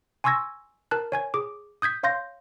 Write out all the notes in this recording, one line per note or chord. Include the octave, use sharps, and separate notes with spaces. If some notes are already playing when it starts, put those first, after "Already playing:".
G#5 C6 C#6 E6 G#6 A#6
A#4 A5 F#6
C#5 G#5 G#6
G#4 D6
D#6 G6 G#6 B6
C#5 F5 C6 G6 A#6